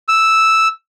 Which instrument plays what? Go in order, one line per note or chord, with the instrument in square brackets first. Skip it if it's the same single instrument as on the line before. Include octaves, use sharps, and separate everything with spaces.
[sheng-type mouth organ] E6